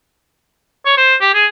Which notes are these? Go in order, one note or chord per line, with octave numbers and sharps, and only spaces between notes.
C#5
C5
G4
G#4